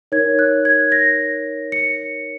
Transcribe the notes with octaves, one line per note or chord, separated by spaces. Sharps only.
D#4 A#4 C#5 G#6
F#6
G#6
A#6
C#7